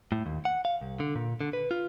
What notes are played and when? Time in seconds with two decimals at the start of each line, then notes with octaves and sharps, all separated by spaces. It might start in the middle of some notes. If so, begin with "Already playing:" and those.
0.12 A2
0.26 D#2
0.45 F#5
0.65 F5
0.81 C2
1.00 D3
1.15 A#2
1.41 D3
1.53 B4
1.71 F4